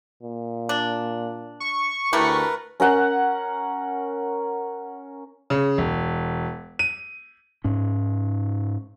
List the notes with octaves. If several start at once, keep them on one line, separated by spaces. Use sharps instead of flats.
A#2
D4
C#6
D2 A3 E4 G4 A#4 B4
C#4 A#4 F#5
C#3
E1
D#7
G#2 C#4